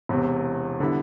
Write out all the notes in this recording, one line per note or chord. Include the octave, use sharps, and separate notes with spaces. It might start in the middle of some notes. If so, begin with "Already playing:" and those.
E1 E2 C3
D3 G3 B3 E4